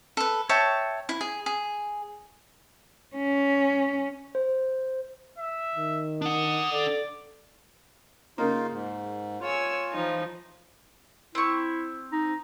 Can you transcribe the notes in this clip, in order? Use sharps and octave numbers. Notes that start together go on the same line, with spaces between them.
A4 B4
C#5 E5 G5 A5
E4
G#4
G#4
C#4
C5
E5
D#3
D4 F#5 D#6
A4 D5
C#3 A#3 D#4 F4
G#2
F4 C#5 G#5 E6
E3 F3 D#4
C4 E4 C#6
D#4